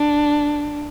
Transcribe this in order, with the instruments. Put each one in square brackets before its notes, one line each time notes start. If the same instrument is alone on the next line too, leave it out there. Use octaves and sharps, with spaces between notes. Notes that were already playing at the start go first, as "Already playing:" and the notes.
Already playing: [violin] D4